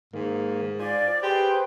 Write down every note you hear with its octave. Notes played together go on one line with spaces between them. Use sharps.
G#2 D#3 A#3
F4 C5 D5 G#5
G4 G#4 B4 C5 G5